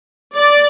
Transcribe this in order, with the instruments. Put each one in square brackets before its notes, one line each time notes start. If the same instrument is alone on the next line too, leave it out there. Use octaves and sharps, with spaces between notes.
[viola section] D5